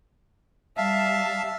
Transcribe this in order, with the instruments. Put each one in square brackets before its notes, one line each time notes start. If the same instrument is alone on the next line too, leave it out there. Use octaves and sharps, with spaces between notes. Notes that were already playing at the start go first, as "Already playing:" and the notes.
[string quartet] G3 A5 [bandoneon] E5 F5